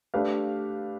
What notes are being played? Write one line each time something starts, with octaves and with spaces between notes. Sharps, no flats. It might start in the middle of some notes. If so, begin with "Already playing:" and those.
A3 D4 G4 B4 F5